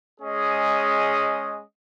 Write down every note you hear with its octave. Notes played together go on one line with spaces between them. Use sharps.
G#3 C#4 G#4 D#5